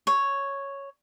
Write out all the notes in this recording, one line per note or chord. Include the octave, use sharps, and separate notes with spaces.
C#5